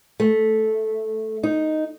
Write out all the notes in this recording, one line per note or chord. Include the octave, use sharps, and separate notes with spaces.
A3
D#4